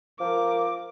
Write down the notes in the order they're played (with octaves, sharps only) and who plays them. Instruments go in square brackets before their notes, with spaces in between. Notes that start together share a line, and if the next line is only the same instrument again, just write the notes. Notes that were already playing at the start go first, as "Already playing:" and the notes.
[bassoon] F3 [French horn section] A#4 [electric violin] D6